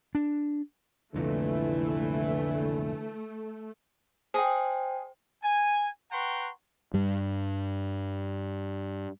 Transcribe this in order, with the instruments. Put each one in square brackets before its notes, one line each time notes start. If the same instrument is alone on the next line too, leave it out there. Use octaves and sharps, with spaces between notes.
[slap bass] D4
[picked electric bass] C2 F2 A#2 [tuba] D3 [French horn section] E3 E4 [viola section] A3
[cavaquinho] G#4 D#5 [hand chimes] C5 G5
[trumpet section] G#5
B4 F#5 G5 A#5 C6 C#6
[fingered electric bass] G2 G3